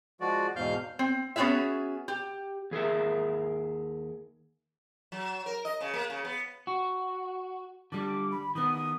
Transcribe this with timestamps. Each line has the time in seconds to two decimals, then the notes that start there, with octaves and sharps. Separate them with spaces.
0.20 F3 G#3 F#4 D5
0.56 E2 G#2 B2 F5 F6 G6
0.99 C4
1.36 B3 C#4 F4 F#4 G#4 E5
2.08 G4
2.71 D#2 G#4 A#4 E5
5.12 F#3
5.46 A#4
5.65 D#5
5.81 C#3
5.94 A#3
6.10 C#3
6.25 B3
6.67 F#4
7.92 D3 G3 D6
8.31 B5
8.55 D#3 B3 D#6